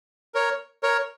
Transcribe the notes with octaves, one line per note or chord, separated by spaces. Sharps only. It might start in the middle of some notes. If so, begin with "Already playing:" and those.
A#4 C#5
A#4 C#5